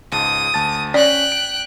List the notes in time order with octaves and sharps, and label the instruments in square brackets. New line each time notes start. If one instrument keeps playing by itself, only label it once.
[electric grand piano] C#2 G#2 A5 [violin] D#6
[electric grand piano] D2 A5 A6
[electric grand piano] C#4 B6 [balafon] D5 [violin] G5 F#6
[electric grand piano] D7